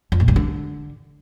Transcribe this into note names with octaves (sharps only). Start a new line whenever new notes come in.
F2
A#2
G2
D3